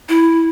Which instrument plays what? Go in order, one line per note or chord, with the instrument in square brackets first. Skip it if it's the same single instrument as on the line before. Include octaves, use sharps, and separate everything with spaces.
[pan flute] E4